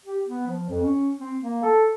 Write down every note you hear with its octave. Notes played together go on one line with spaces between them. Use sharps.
G4
B3
F3
F2
C#4
C4
A#3
A4